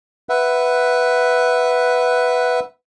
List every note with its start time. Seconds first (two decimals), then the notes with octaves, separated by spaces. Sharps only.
0.29 B4 E5 F#5